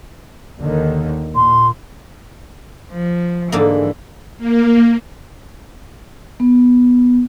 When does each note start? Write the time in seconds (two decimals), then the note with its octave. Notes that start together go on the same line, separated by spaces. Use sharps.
0.59 D#2 D3 D#3
1.35 A#2 C6
2.92 F3
3.52 G#2 D3 E3 A#3
4.37 A#3
6.40 B3